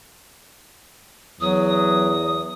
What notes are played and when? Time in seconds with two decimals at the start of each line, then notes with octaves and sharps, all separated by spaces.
1.41 E2 F#3 D#6